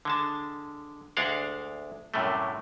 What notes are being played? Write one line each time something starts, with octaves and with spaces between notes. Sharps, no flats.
D3 G#3 A5
D2 G#3 D4 F5 F#5
F#2 A2 C3 F#3 G3 A3